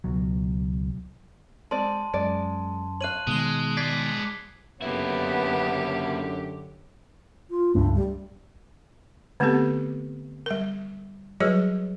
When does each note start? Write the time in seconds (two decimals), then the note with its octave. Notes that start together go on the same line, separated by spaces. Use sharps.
0.04 C#2 B2 F#3
1.71 G#3 C4 D5 A5 C6
2.14 F#2 G#3 D5
3.01 C#5 F5 F#6 D#7 F#7
3.27 B2 D#3 G#3 D#7 G7
3.77 G#3 D5 G#6 B6 C7
4.82 F#2 D3 A#3 B3 E4 G4 C#5
7.50 F4
7.75 C#2 G2 A3 D4
7.95 G3
9.40 D3 A3 B3 C4 G4 A4
10.46 G3 A#4
11.40 F#3 G3 F#4 G#4 B4 C#5